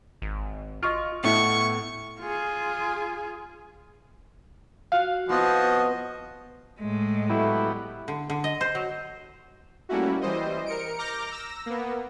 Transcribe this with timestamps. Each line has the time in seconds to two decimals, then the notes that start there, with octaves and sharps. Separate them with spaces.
0.22 G#1
0.83 F4 D#5 C#6 F6
1.24 A2 A3 B3 E4 C#6
2.20 F4 G#4
4.92 F4 F#4 F5 F#5
5.29 F3 B3 C4 E4 F#4 D#5
6.80 A2 G#3
7.30 F#3 G3 A3 B3 E4
8.08 D3
8.30 D3
8.44 D#5
8.61 C5
8.75 F#3
9.89 G3 A3 A#3 C#4 E4 F#4
10.21 E3 G3 C5 D#5
10.66 A#4 C#7 D7
10.98 A#5 D6 F6 G6 A#6
11.31 E6 A#6
11.66 A#3 B3